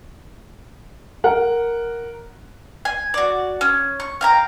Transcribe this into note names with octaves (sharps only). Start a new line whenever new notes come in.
A#4 F#5
G#5
F#4 D5
C#4
C#6
F5 G5 A#5